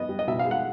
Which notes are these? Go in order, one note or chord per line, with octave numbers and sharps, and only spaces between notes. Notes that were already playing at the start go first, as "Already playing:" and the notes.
Already playing: B3 D#5
G3
D#5
B2 E5
F5
G#3
F#5